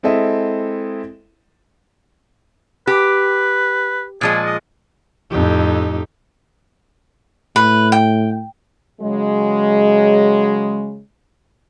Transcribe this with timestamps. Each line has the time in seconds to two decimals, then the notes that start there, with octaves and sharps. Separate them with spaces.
0.03 G#3 C4 E4 A4 D#5 E5
2.87 G4 B4
4.21 A#2 F3 G#3 G#4
4.45 D#5
5.31 F2 A2 D#4 G4
7.56 A2 B4
7.92 G5
9.01 C#3 F#3 G#3